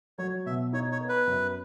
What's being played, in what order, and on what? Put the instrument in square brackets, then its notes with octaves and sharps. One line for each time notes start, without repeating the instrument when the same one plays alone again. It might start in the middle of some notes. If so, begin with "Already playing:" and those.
[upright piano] F#3 [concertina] C#5
[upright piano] B2 [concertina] E5
[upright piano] D#4 [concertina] C#5
[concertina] C#5
[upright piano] B3
[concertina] B4
[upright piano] F#2